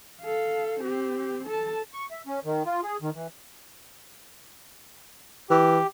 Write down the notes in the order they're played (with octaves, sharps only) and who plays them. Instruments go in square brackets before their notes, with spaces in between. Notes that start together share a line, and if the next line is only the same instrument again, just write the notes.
[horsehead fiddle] A4 F5
C4 G4
A4 A5
[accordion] C#6
E5
C#4
D#3
F4
G#4
D#3
E3
[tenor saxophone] E3 [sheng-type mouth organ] G4